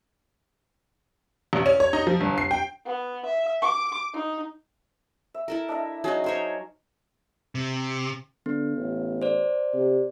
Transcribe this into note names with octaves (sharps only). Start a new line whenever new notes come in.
A1
C#4
C#5
D#4
F3
G1
C7
G5
B3
E5
D6
D#4
E5
E4 A4 A#4
D4 D#5 E5
F#3 C#4 D#4 G#4
A#4 C5 C#5
C3
D3 B3
A1
C5 D5
C3